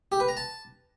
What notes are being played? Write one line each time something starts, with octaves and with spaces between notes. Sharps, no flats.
G4
B4
A#5
A5